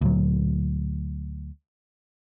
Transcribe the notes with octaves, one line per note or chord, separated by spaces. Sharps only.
D2 A#2 F#3